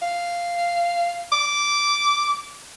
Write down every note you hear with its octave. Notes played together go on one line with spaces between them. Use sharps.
F5
D6